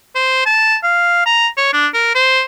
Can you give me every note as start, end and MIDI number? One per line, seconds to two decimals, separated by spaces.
0.15 0.45 72
0.46 0.76 81
0.83 1.25 77
1.26 1.47 82
1.57 1.72 73
1.73 1.88 62
1.94 2.13 70
2.15 2.43 72